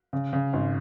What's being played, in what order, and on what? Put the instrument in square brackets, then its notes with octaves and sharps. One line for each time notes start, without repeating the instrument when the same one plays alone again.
[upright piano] C#3
C#3
G#1